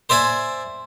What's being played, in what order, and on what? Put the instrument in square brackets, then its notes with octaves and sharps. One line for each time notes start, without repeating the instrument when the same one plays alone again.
[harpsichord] C5 D5 E5 G#5